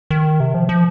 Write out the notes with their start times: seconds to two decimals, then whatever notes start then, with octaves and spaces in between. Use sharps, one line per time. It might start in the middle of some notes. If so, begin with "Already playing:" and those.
0.11 D#3
0.40 C3
0.54 F3
0.69 F3